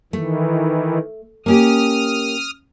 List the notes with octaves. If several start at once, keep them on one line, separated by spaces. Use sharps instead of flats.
D#3 E3 A3
A#3 C#4 G4 D#6 F6